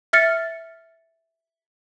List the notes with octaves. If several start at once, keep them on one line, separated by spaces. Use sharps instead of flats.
E5 F6 A6 C#7